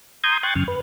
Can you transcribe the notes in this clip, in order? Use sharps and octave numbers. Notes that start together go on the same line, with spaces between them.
A#5 C6 D#6 G6 G#6
G5 C6 C#6 F#6 G#6 A6
F#2 C#3 F6
B4